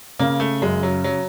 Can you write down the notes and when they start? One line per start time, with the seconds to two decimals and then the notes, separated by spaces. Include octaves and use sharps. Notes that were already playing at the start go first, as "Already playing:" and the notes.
0.19 C#3 A#3
0.40 A3
0.61 F#2 G#3
0.83 F#3
1.04 F#3